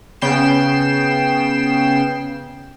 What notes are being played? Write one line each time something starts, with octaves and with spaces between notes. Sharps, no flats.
C#3 B3 G5 C7 E7